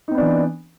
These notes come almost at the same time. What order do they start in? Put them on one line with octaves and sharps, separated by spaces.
D#4 C4 B3 D4 E3